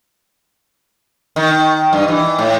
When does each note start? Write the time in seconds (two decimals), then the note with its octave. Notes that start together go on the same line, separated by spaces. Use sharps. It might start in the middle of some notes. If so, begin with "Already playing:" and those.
1.36 D#3
1.93 G2
2.08 E3
2.38 A2